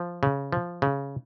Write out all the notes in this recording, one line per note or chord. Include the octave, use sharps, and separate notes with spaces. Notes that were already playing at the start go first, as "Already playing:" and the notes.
Already playing: F3
C#3
F3
C#3